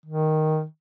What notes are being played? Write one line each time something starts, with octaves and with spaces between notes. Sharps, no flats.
D#3